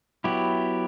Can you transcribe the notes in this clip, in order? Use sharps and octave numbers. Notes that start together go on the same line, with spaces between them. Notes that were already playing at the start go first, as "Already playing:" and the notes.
F#3 B3 E4 G4